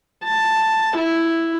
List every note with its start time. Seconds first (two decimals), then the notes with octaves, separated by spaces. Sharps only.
0.24 A5
0.97 E4